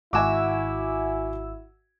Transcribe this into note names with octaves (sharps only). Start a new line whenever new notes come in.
G#1 E4 F#4 E5 G#5 D6 E6